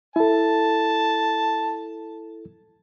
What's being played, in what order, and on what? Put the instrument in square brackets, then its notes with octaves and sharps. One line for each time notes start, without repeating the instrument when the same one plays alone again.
[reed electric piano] E4 A4 [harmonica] A5